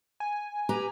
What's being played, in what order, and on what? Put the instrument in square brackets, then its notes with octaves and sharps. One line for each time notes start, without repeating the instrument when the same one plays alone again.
[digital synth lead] G#5
[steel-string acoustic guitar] G4 B4 A#5